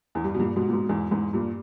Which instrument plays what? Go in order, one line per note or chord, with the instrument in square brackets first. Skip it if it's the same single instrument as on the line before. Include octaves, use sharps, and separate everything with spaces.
[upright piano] E2
G2
B2
G2 A#2
G#2 B2
A#2
G#2 B2
E2 G#2
E2 G#2
G2 A#2